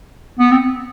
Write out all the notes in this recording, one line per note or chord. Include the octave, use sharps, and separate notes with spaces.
B3
C4